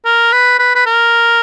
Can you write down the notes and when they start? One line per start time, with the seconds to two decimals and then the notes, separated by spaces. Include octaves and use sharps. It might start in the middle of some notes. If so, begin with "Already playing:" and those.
0.05 A#4
0.32 B4
0.59 B4
0.75 B4
0.86 A#4